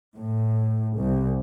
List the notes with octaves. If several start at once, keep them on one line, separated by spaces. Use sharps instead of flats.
A2
C2